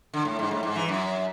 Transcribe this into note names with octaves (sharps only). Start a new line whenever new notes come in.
D3
A2
G#2
A2
G#2
E3
F#2